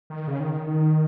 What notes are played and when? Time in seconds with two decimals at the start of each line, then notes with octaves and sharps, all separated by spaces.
0.10 D#3
0.28 C#3
0.40 D#3
0.54 D#3
0.67 D#3